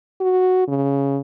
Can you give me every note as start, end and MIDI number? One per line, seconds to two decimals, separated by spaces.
0.21 0.67 66
0.68 1.20 49